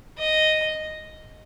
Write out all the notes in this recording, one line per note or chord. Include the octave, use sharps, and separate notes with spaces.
D#5